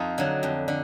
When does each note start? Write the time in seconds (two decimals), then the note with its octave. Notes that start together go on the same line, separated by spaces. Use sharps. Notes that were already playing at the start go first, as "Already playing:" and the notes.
Already playing: F2 D#4 F4
0.18 D3 F#3
0.43 F2
0.68 D3